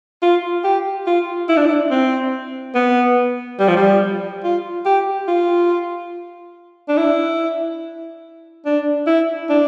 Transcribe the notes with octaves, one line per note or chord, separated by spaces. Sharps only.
F4
G4
F4
E4
D4
E4
C4
B3
G3
F3
G3
F4
G4
F4
D4
E4
D4
E4
D4